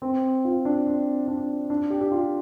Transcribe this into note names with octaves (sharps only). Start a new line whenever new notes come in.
C4
F4
D4
C4
D4
D4
G4
G4
F4